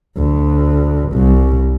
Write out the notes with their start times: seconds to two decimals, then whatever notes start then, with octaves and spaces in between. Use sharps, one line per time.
0.18 D2
1.13 C2